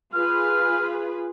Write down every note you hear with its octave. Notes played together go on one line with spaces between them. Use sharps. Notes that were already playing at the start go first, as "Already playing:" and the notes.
F4 G#4 B4 F6